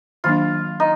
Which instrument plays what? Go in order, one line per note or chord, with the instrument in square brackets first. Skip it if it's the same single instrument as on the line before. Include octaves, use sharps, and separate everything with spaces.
[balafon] D#3 F#3 A#3 D4 [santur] F4
[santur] D#4